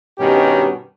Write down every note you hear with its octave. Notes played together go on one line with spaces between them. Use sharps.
G2 B2 D#3 C#4 G4